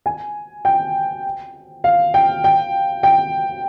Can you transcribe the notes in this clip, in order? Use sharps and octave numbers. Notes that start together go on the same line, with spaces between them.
G#5
G5
F5
G5
G5
G5